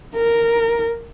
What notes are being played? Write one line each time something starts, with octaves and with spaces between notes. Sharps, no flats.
A#4